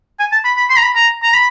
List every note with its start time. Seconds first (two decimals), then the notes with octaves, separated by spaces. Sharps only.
0.19 G#5
0.32 A5
0.45 B5
0.57 B5
0.70 C6
0.77 A#5
0.83 B5
0.95 A#5
1.23 A#5
1.34 B5